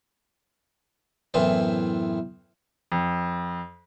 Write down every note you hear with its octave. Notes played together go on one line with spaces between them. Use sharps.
F#2 A2 E3 B3 C4 C5
F2